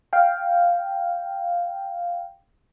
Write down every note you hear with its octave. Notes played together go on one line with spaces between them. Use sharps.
F5 G5